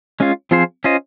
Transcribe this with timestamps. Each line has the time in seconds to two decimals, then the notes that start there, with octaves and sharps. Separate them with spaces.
0.20 G#3 C#4 F4
0.51 F3 C4 F4 G#4 C5
0.84 C#4 F4 C5 D#5